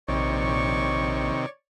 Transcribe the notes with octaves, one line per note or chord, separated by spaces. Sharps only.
A#1 C3 D#3 C#5 D5 C#6